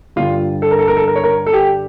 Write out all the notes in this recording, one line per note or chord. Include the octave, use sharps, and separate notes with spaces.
G2 D3 G3 F4
A4
A#4
A4
A#4
A4
A#4
C#5
A#4
A4
G4